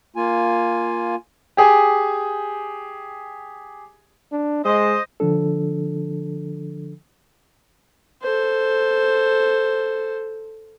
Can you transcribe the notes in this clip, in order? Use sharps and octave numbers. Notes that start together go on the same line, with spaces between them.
A#3 F4 G#5
G4 G#4 G#5
D4
G#3 C5 D#5
D3 F3 D4 A4
A4 C5